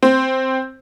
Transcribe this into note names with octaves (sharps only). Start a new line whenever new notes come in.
C4